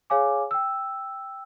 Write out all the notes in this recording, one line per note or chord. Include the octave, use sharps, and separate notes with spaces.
G#4 C#5 F5 G#5 D6
G5 E6